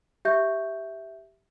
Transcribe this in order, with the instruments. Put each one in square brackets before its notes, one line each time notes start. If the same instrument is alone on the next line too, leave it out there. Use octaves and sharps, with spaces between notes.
[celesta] G4 E5 G6